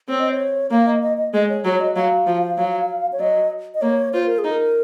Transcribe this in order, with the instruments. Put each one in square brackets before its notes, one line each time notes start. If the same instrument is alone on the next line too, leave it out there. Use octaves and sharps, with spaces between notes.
[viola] C4 [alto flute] C#5
[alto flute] D#5
C#5
[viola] A#3 [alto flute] F5
[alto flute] D#5
D#5
D#5
[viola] G#3 [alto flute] D#5
[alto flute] C#5
[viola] F#3 [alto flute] C#5
[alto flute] C#5
D#5
[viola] F#3 [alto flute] F5
[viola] F3
F#3
[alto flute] C#5
[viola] F#3 [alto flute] D#5
[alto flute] D#5
[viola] A#3 [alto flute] C#5
[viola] F4 [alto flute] C5
[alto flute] A#4
G#4
[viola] D#4
[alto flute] A#4